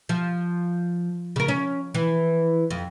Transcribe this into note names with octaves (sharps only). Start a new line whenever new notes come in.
F3
C#3 A#4
C#4
E3
F2